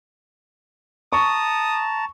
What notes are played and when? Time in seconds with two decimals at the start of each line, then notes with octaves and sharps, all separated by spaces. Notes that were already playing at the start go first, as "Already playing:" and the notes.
1.13 A5 A#5 C#6 D#6